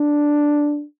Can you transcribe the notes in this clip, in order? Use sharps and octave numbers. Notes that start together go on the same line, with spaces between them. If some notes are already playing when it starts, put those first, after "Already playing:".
Already playing: D4